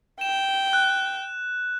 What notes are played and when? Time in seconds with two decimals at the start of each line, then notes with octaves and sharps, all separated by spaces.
0.21 G5 E7
0.73 F#6